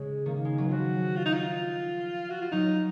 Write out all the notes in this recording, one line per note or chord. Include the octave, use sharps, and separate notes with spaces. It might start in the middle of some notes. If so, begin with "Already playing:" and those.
Already playing: C#3 G#3
D#3 A#3
G#3
F#3
F4
F3 F#4
F4
D#4
F4
F#4
F4
F#3 D#4